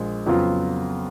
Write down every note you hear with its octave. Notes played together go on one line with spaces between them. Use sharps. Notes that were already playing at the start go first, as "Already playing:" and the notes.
Already playing: A#1 A#2 G#3
F2 C#3 F#3 B3 F4